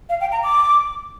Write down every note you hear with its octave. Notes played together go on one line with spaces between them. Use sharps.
F5
G5
A#5
D6